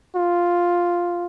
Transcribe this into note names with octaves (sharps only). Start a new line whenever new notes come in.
F4